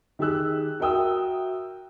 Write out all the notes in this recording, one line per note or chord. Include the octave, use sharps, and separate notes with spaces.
D#3 G4 G#4 E6 F#6
F#4 A#4 E5 G5 D#6 E6